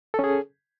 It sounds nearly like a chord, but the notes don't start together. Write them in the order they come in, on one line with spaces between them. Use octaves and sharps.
A4 C#4 G#4